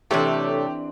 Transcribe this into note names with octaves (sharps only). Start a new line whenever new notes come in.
C3 E3 A3 C4 D4 G4 A4 C#5